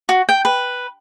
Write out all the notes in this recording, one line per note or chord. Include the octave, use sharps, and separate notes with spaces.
F#4
G5
B4